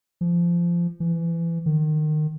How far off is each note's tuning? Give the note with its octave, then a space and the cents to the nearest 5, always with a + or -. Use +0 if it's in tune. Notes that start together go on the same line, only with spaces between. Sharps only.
F3 -20
E3 +25
D#3 -25